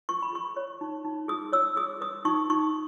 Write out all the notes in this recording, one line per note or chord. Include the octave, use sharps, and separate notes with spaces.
B4 C#6
B5
G#4 C#6
C#5
D#4
D#4
G#4 D#6
C#5 E6
G#4 D#6
B4 D#6
D#4 C#6
D#4 C#6